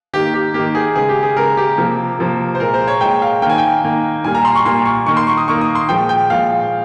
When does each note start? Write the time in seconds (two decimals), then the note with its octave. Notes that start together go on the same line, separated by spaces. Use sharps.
0.13 D#3 A#3 G4
0.34 G4
0.54 D#3 A#3 G4
0.75 G#4
0.96 C#3 G#3 G#4
1.09 G4
1.23 G#4
1.36 C#3 G#3 A#4
1.57 G4
1.77 C3 F3 A#3
2.19 C3 F3 A#3
2.55 C5
2.60 A#2 G#3 A#4
2.74 C5
2.87 C#5
3.01 A#2 G#3 G5
3.22 F5
3.42 A#3 G5
3.46 D#3 G#5
3.58 G5
3.83 D#3 A#3
4.24 A#2 G3 A#3 G#5
4.35 A#5
4.45 C6
4.55 C#6
4.65 A#2 G3 A#3 C6
4.86 C#6
5.06 D#3 A#3 C#6
5.17 C6
5.27 C#6
5.37 D#6
5.48 D#3 A#3 C#6
5.61 D#6
5.75 C6
5.89 A#2 F3 G#3 G5
6.09 G5
6.30 A#2 F3 G#3 F5